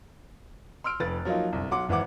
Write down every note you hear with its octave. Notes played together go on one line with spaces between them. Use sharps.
C6 E6 F6 D7
F1 B4 A6
F3 F#3 A#3 D#4 F4
G1 C2
B1 F#3 F#5 C6 D6
G#1 E3 E5 F#5 D6